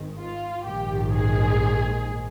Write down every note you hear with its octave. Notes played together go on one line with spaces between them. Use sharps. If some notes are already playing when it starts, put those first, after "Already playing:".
Already playing: G#1 G#2 D#3
F4
A#1 G#2 D#3 G4
G#4